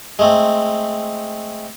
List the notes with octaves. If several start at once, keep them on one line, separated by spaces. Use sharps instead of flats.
G#3 A3 C4